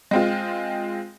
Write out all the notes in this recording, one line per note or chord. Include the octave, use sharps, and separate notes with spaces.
G#3 C4 F4